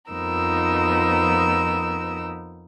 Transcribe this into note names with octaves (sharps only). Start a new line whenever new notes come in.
F2 F3 B3 D#4 A#4 E6